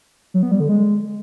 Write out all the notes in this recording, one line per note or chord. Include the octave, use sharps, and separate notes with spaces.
F#3
B3
G3
D3
G#3